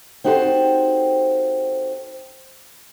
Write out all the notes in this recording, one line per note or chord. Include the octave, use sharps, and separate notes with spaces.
C4 D#4 F#4 G4 A4 C5